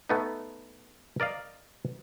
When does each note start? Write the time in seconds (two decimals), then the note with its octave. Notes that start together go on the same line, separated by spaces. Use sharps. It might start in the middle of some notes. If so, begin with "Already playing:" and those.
0.09 A3 B3 D#4
1.20 A#4 D5 D#5 F5